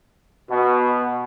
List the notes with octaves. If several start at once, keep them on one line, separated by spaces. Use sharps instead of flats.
B2